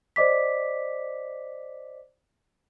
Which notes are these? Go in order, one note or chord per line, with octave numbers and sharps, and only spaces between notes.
C5 D5 D#5 D6 B6